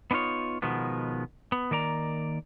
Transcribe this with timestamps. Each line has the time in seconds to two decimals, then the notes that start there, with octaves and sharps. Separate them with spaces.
0.11 B3 D4 D#4 F4 C#5
0.62 B2 D#3 F3 G#3 B3
1.52 B3
1.71 D#3 A#3 D5 A#5